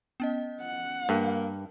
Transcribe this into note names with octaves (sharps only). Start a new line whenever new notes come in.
B3 C#4 D#5
F#5
G2 A#3